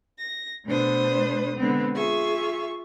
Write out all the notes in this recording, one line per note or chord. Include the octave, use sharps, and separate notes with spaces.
A#6
B2 A3 D4 B4 C5 D#6
D3 G#3 B3 C4
F4 G#4 E5 C#6